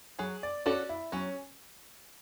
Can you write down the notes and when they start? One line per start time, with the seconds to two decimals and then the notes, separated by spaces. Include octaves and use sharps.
0.19 F#3 G#4
0.43 D5
0.66 C#4 F#4 A4 D5
0.89 E4
1.12 F#3 C#4